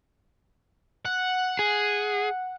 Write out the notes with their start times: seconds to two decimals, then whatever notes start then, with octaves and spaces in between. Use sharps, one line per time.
1.06 F#5
1.59 G#4